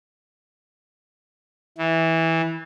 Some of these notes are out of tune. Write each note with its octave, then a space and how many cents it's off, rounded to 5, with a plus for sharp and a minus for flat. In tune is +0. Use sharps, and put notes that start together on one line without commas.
E3 -15